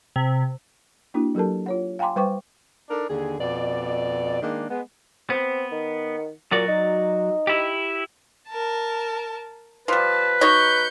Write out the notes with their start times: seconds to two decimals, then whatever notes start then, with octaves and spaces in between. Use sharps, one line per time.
0.16 C3
1.14 A#3 D4 E4 F#4
1.35 F#3 G4 A4 A#4 A5
1.66 F4 C#5 F#5
1.99 F5 G5 G#5 A#5 C6 D6
2.16 G3 B4 C5 G5 C#6 D6
2.90 D4 D#4 A4 A#4
3.09 D#2 D3 G#4
3.39 F2 B2 D5
4.42 D#3 G#3 A#3 D4
4.69 G#3 B3
5.30 B3 C4
5.72 D#3
6.52 A#2 F#3 F#4 D5
6.68 D#4
7.47 E4 G4
8.49 A#4 A5
9.88 F3 G3 B4 A5
10.41 F#3 D#4 C#5 G6 C#7